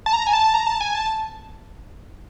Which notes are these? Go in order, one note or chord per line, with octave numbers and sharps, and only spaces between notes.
A5
A#5
G#5
A5
A#5
A5
G#5
A5